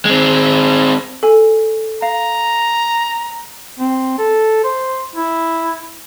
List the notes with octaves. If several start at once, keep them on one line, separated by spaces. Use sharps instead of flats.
G#3 C4
A4 G#5
F5 A#5
C4
A4
C5
E4